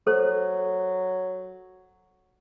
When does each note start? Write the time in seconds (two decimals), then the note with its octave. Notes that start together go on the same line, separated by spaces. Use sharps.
0.07 F#3 A4 C5